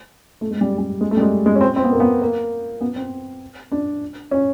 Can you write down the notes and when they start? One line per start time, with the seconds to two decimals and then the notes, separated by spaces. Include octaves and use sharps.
0.41 A3
0.51 G#3
0.61 G3
0.78 G3
1.01 G#3
1.11 A3
1.17 G3
1.21 G#3
1.46 G#3
1.55 C#4
1.61 C4
1.76 C4
1.84 B3
1.92 A#3
2.00 B3
2.22 A#3
2.81 B3
2.96 C4
3.72 D4
4.31 C#4